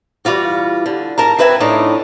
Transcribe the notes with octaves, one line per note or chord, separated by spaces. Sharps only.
E3 G3 F4 F#4
D3
G#2 A#4 A5 A#5
D2 C4 B4 E5 F#5 G#5
F2 A2 D4 D#4